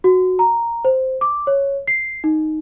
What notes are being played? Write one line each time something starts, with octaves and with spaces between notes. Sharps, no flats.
F#4
A#5
C5
D6
C#5
C7
D#4